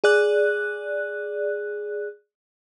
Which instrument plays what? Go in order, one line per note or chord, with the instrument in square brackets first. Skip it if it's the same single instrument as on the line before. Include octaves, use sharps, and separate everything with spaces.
[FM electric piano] G#4 D5 F#6